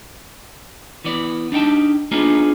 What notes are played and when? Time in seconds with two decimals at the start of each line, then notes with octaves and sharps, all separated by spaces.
1.04 E3 B3 D5
1.52 D4 D#4 F#5 G5 A5
2.12 A#3 B3 D4 D#4 F4 G#4